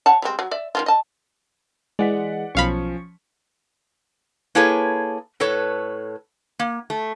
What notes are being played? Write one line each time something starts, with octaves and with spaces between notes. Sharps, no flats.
C#5 F#5 A5
G3 G#3 C4
F#3
D5 E5
D#3 A#3 F4
D#5 A5
E3 G#3 D5 F#5 B6
B1 F3 C#4 F5 B5 C#6
A#3 E4 G#4 A4 B4 C#5
A2 A4 B4 C#5
A#3
A3